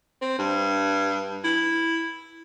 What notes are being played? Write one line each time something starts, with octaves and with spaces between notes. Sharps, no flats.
C4
G2
E4